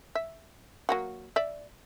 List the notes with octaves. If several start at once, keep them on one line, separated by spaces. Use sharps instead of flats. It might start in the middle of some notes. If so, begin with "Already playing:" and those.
E5
F#3 A#3 F#4
D5 E5